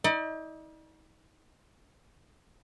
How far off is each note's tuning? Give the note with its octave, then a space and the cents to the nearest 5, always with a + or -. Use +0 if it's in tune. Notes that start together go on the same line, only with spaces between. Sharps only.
D#4 +45 D5 +35